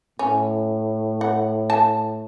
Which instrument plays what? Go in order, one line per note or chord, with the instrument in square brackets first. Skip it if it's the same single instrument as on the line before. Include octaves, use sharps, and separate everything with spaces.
[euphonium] A2 [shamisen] C#4
[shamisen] F#5
A5